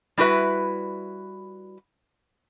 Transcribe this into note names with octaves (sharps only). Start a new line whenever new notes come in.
G3 E4 F#4 B4 E5